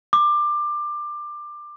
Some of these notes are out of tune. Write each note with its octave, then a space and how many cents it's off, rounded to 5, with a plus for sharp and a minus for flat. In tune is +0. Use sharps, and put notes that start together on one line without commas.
D6 +20